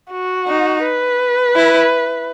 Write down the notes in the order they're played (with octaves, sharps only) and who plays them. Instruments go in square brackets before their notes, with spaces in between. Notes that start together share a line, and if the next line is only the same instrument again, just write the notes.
[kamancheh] F#4
[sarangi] D#4
[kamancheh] B4
[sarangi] E4